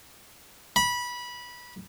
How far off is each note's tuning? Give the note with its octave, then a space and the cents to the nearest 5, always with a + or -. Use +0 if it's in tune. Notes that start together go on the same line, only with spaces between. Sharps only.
B5 -20